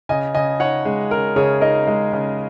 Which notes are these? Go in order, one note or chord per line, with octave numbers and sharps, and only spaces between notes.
C#3 D#5 G#5
C#3 D#5 G#5
D#4 C#5 F#5
G#3
C#3 A#4
C#3 G#4 C#5
D#4 A#4 D#5
G#3
C#3